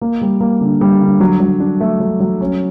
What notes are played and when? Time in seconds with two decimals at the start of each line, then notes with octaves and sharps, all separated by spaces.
0.02 A#3
0.22 G3
0.41 A#3
0.61 D3
0.81 G3
1.01 D3
1.20 F#3
1.40 F#3
1.60 D4
1.80 A3
2.00 F#3
2.20 F#3
2.41 C#4